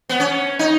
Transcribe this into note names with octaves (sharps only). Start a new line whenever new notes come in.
B3
C#4
D#4